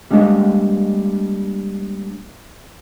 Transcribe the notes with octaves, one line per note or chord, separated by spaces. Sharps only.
G3 G#3 A#3 D4 D#5